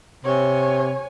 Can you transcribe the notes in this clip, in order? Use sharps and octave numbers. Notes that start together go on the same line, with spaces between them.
C3 C#5 G#5